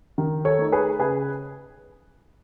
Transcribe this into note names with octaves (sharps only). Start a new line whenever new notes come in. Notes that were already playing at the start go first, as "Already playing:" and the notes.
D#3
A4 C#5
A3 D#4
G#4 B4
C#3 G#4 B4